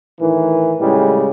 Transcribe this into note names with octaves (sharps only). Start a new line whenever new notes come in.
A2 D#3 E3
A2 C#3 G3 G#3